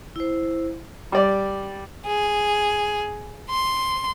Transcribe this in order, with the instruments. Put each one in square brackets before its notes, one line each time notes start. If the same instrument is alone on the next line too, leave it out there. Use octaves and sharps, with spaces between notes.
[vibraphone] E4 C5
[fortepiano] G3 D5
[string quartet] G#4
C6